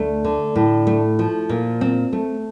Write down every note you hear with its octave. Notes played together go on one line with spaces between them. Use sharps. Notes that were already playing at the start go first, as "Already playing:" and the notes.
Already playing: D2 A3
D3
A2
A3
F3
A#2
C4
A3